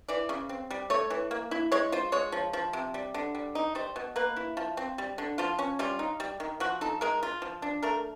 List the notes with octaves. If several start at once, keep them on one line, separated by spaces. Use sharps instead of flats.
E3 D5
C#3
C4
G3
A3 C#5
E3
A#3
E4
G#3 C#5
F4 C5
G#3 C#5
F3
F3
C3
G3
D3
G3
D#4
G3 C5
B2
A#3 B4
E4
F3
C4
G3
D3
F3 F4
C#4
G3 F4
D#4
G3
D#3
F3 F#4
D#4 A4
G#3 A#4
F4
F3
D4
A3 A#4